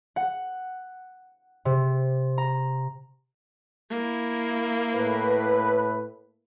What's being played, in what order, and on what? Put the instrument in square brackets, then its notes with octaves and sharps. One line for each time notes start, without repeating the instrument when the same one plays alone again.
[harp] F#5
C3
A#5
[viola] A#3 E4
[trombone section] A2 B4